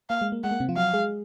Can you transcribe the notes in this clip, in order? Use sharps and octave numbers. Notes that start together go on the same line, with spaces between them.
A#3 F5
G#3
A#3
G#3 F#5
A#3
C3 C4
F3 F4
F#3 F#4 F5
G#3 G#4